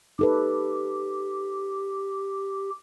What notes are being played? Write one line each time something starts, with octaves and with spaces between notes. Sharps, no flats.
D#4 G4 A4 B4